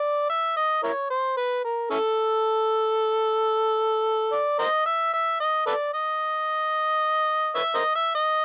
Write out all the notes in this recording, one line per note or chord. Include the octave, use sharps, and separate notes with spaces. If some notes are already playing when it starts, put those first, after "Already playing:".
Already playing: D5
E5
D#5
E4 A#4 C#5
C5
B4
A#4
C#4 E4 A4
D5
A#4 C5 D#5
E5
E5
D#5
A4 B4 D5
D#5
B4 C#5 E5
A#4 C5 D#5
E5
D#5